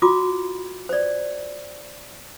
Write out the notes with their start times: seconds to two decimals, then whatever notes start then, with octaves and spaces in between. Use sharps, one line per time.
0.02 F4 F#4 D6
0.89 C5 D5